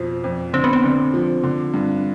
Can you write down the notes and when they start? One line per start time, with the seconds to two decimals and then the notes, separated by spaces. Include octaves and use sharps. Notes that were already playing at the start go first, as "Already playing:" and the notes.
Already playing: F2 B2 F3
0.24 F2
0.53 D3 C4
0.64 B3
0.73 C4
0.83 D3
1.14 F3
1.44 D3
1.74 G2